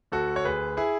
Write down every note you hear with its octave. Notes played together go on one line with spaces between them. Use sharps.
D2 F#4 A4
C#5
D2 G#4 B4
E4 G#4